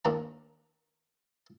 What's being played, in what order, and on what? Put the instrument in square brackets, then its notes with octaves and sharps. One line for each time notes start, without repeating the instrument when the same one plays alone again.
[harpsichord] D#2 D4 A#5